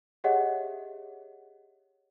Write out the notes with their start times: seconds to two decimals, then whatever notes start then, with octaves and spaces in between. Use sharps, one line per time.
0.24 G4 G#4 C#5 D#5 E5 F#5